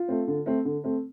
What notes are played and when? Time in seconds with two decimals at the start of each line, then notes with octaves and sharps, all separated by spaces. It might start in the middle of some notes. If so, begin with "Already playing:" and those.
Already playing: F4
0.08 A3 C4
0.28 D3
0.46 A3 C4
0.65 D3
0.84 A3 C4